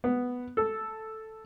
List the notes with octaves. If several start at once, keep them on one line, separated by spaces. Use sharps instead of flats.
B3
A4